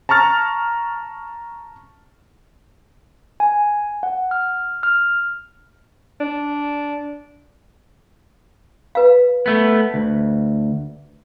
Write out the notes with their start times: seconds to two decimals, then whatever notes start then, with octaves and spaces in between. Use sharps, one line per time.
0.09 A5 A#5 C#6 F6 A6
3.40 G#5
4.03 F#5
4.31 F6
4.83 F6
6.20 D4
8.95 B4 F5
9.46 A3 B3
9.94 D2